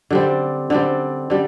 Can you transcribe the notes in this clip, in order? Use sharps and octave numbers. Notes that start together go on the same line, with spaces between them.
D3 G3 C4
D3 G3 C4
D3 G3